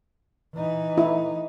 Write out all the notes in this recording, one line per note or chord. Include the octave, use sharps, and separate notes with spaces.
E3 D#4
E4